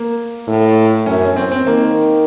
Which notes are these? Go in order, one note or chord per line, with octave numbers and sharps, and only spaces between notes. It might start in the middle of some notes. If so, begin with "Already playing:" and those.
Already playing: A#3
A2
F#2 C#4
C#4
C4
C4
D#3 A#3